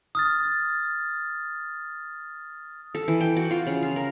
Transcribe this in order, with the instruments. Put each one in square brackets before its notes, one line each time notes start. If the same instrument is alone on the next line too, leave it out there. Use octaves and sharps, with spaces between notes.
[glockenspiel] D#6 F6 A6
[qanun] A4
E3
G5
F#4
F4
C#3
F4
A#4